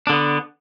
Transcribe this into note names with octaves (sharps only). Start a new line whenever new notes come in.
D3 B3 D4